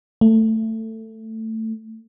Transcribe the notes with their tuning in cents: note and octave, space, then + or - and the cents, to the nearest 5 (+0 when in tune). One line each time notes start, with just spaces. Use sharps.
A3 +15